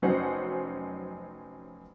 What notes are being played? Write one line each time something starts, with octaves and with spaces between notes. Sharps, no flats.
F1 F#3 C#4 C5 D#5 F#5